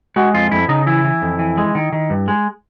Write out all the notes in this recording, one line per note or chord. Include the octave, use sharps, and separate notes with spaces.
G#3 F#4
F2 F4
F2 E4
C#3 D#4
E3 E4
E3
F2
E3
G#3
D#3
D#3
G2
G#3